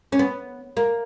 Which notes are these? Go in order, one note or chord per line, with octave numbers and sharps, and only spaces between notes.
C#4
B3
A#3